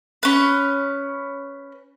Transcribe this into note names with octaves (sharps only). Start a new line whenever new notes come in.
C#4 B4